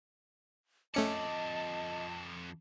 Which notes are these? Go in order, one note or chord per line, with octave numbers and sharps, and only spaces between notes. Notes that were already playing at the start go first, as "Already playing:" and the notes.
F2 A3 C#4 D5 D#5 A5 C#7